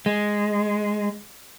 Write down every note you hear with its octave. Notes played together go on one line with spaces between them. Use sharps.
G#3